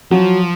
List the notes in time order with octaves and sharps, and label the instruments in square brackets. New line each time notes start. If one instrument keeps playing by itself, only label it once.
[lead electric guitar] F3 [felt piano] F#3